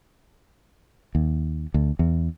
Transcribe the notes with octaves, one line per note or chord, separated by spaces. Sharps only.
D#2
D2
E2